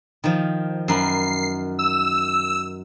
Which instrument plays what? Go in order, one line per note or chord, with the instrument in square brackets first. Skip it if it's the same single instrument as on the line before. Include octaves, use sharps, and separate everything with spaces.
[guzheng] D#3 F3
[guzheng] F#2 A#4 B5 [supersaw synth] C7
[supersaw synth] E6